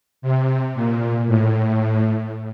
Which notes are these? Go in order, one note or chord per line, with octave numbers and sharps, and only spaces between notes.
C3
A#2
A2